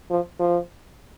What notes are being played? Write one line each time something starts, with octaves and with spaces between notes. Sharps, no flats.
F3
F3